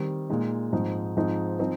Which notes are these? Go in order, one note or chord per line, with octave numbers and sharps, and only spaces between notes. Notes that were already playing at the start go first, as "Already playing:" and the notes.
Already playing: D#3 G3 C4
A#2 G#3 D#4
G#2 F3 C4 D#4
G#2 F3 C4 D#4
F3 C4 D#4